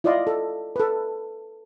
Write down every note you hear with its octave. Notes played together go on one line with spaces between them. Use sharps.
E4 F4 D5 D#5 F5 C6
A4
A4 B4